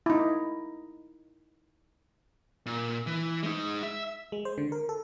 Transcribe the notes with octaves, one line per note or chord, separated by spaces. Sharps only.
D#4 E4
A#2
E3
G#3 D#4
E5
G#3
C5
D3
A#4
A4